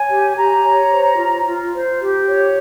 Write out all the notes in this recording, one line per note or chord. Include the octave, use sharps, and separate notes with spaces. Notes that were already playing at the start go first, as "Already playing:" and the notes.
Already playing: C#5 G#5
G4
G4 A#5
C#5
C5
F4
F4
C5
G4
C#5